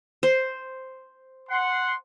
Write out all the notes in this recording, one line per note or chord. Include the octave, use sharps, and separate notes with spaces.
C5
F#5 C6